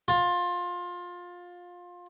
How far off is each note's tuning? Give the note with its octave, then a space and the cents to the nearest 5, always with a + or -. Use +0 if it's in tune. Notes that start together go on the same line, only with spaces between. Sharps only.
F4 +20